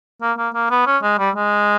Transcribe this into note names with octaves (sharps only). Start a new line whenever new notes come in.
A#3
A#3
A#3
B3
C#4
G#3
G3
G#3